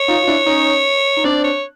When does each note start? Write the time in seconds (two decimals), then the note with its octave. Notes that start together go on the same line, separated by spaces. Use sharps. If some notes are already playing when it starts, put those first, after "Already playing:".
Already playing: C#5
0.08 D#4 F4
0.22 F4
0.27 D4 E4
0.46 C#4 D#4
1.17 D#4
1.24 C4 D4 D5
1.44 C#5